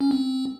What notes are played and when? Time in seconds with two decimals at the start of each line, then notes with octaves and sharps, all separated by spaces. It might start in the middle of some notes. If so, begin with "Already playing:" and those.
0.01 C#4
0.11 C4